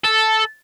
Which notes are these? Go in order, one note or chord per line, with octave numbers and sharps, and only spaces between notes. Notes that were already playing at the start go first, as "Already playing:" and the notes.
A4